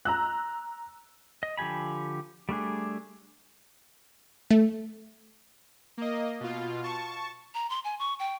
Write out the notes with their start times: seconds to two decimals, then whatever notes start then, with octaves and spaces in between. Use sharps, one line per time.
0.05 A#5 E6 F#6
1.43 D#5
1.57 D3 F3 G4 G#5 B5
2.49 G3 A3 D4 G#4
4.51 A3
5.97 A#3 D#5
6.40 B2 F4
6.84 A5 C#6
7.54 A#5
7.70 C6
7.84 G#5
7.99 C#6
8.19 G5